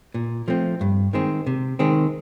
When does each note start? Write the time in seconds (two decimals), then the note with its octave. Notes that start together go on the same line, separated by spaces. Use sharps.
0.14 A#2
0.48 F3 A3 C4
0.81 G2
1.13 D#3 G#3 C4
1.47 C3
1.79 D#3 G#3 C4